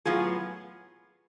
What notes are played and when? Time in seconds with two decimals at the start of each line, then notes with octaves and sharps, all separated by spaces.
0.05 A2 F#3 B3 F4 G#4